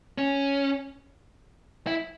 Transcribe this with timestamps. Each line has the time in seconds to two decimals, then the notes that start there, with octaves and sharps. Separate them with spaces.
0.18 C#4
1.87 E4